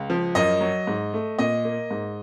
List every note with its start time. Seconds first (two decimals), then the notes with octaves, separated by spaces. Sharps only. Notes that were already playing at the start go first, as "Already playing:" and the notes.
Already playing: C#2
0.10 F3
0.35 F#2 D#5
0.61 F#3
0.87 G#2
1.13 A3
1.39 A#2 D#5
1.65 A#3
1.91 G#2